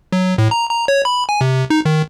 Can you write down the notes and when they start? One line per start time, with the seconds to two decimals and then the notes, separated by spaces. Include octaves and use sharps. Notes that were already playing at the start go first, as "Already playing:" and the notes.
0.12 F#3
0.38 A2
0.51 A#5
0.71 A#5
0.88 C#5
1.05 B5
1.29 G#5
1.41 C3
1.70 D#4
1.85 D#3